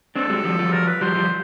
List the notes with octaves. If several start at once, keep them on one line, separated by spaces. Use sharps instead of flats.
C4 D4 A4
F#3 G#3
F3 G3
F3 G3
A#4
B4
F3 G3 C5
F3 G3